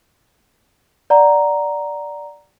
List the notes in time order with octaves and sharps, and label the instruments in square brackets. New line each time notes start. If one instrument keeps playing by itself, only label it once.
[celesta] D5 F#5 A#5